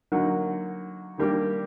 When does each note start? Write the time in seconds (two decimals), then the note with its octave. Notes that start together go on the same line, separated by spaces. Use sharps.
0.12 D3 F#3 A#3 D#4 F#4
1.18 D#3 G3 A#3 D4 G4